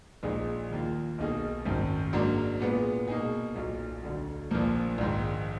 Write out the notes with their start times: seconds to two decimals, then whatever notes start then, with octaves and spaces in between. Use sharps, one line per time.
0.23 A#1 A#2 G#3 D#4 G#4
0.71 D#2 D#3 A#3 F4
1.18 B1 B2 A#3 D#4 G#4
1.65 G#1 F#2 D#3
2.13 G#2 F#3 A#3 D4
2.60 A#2 G#3 B3
3.08 B2 A#3 D#4 G#4
3.55 B1 A#2 F#3
4.03 D2 D3 F#3
4.51 A#1 A#2 F3 A#3
4.98 A#1 G#2 D#3